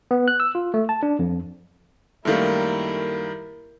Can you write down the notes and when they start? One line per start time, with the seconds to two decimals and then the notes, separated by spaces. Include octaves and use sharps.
0.11 B3
0.28 F#6
0.40 E6
0.55 F4
0.74 A3
0.89 A5
1.03 D4
1.19 F2
2.25 F#2 D#3 G3 A3 A#3 E4 A#4